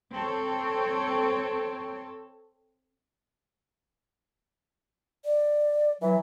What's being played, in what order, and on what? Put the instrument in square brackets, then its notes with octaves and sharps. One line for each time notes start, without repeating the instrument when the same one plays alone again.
[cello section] C4 A4 C#5
[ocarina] D5
[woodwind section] E3 F#3 [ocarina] E5